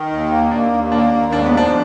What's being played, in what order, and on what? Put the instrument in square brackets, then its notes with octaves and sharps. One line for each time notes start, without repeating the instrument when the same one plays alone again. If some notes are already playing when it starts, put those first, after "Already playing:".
Already playing: [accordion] D#3 [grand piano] D#4
[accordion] D#2
A#3
[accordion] D#2 [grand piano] D4
[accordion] D#2
[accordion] A#3 [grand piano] D4
[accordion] D#2
[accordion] G#2 [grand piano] D4
[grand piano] B3
[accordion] F3 [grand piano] D4